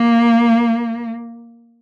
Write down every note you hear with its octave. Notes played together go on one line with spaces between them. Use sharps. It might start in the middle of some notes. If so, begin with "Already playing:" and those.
Already playing: A#3